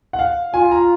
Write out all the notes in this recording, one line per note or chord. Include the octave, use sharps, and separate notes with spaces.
F#5
F5
F4 G#5
A#5